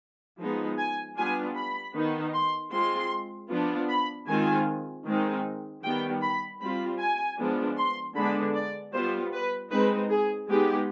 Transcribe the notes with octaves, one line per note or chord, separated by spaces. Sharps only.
F3 G#3 B3 D#4
G#5
G3 B3 D4 F4 G#5
B5
D#3 B3 D#4
C6
G#3 C4 F4 C6
F3 B3 D4 F4
B5
D#3 G#3 C4 F4 G#5
D#3 G#3 C4 D#4
D#3 G3 B3 G5
B5
G3 C4 F4 B5
G#5
F3 G#3 B3 D4
C6
D3 G#3 B3 D4 B5
D5
G3 B3 F4 C5
B4
G#3 C4 D#4 B4
G#4
G#3 B3 D#4 G4